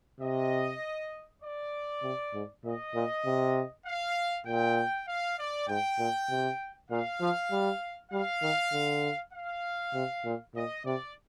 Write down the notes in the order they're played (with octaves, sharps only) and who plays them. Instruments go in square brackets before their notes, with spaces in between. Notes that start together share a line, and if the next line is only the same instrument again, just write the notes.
[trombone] C3 [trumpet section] D#5
[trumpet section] D5
[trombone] C3
G#2
[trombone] A#2 [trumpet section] D#5
[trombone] A#2
C3
[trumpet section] F5
[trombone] A#2 [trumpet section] G5
[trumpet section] F5
D5
[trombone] G#2 [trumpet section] G5
[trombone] A#2
C3
[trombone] A#2 [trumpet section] F5
[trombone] F3
G3
[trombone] G3 [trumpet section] F5
[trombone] D#3
D3
[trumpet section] F5
[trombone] C3
A#2
[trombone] A#2 [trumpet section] D#5
[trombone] C3 [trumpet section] D5